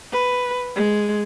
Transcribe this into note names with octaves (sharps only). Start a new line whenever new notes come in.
B4
G#3